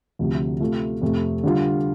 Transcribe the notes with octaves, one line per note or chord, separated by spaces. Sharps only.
D2 C3 F3
C3 A3 F4 A4
F2 C3 A3
D3 G3 F4